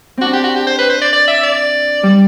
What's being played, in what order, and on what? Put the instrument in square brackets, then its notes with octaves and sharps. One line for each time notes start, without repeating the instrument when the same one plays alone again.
[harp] C4 D4 [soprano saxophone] F#4
[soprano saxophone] G4
F#4
G4
C5
B4
C5
D5
D5
E5
D5
[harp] G3